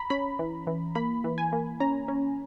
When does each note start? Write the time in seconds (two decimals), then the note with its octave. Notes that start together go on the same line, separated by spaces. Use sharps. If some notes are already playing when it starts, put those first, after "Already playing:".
Already playing: A#5 B5
0.10 C#4 B5
0.39 E3
0.67 E3
0.95 A#3 B5
1.24 E3
1.38 G#5
1.52 A#3
1.80 C#4 A#5
2.08 C#4